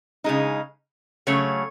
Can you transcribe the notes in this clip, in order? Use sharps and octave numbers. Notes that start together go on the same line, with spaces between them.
C#3 G#3 D#4
C#3 F#3 A3 C#5